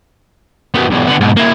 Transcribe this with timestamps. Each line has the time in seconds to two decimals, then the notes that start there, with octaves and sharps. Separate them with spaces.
0.75 F#2 B3
0.90 B1 E2
1.07 D3 B3
1.21 G#2 B2
1.36 A#3 E4